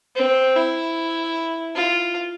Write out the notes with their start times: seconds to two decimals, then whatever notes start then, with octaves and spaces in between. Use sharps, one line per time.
0.16 C4
0.56 E4
1.75 F4